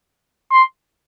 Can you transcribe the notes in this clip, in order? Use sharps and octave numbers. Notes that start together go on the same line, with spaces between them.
C6